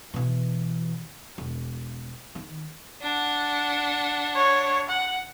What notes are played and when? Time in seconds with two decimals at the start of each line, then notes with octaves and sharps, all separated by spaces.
0.14 B2 E3
1.38 E1
2.35 D#3
3.02 D4 F#5
4.36 C#5
4.89 F#5